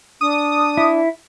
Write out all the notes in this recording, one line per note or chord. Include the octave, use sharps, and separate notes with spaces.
D4 D#6
E4